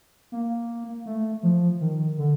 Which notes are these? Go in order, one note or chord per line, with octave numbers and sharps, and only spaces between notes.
A#3
A3
F3
D#3
D3